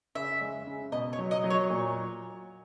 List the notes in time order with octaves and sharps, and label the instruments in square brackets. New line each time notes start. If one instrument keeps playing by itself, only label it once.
[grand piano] C#3 [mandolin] E5
[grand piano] G#3
C#3
[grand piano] B2 [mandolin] D#5
[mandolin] C#5
[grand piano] F#3
[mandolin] D#5
[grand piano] F#3
[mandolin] C#5
[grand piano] A#2